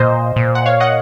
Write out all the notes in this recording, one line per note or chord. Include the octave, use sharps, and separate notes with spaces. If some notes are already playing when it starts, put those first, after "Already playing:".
Already playing: A#2 C5 D#5
A#2
F#5
C#5 F5
D#5 F#5